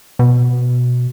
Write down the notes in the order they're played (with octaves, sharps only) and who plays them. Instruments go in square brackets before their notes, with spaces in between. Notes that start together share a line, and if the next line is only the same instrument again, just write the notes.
[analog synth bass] B2